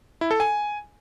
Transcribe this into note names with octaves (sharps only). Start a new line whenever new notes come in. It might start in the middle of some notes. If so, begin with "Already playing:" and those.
E4
A4
G#5